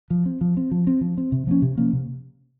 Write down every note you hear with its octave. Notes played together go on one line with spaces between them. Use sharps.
F3
C4
F3
C4
F3
C4
F3
C4
C3
F3 A#3 C#4
C3
F3 A#3 C#4
C3